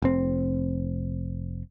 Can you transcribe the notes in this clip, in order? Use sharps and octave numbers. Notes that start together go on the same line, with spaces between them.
F1 C4